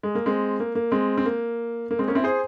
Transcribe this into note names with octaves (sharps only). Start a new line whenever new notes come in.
G#3
A#3
G#3 C4
A#3
A#3
G#3 C4
C4
A#3
A#3
G#3 C4
A#3 C#4
C4 E4
G#4 C5